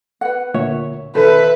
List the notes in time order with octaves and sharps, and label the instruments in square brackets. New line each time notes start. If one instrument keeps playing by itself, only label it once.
[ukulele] B4 F#5
[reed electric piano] D2 A#2 C#5 [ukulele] E5
[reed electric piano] B2 D#3 [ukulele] A4 C5 [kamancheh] B4 E5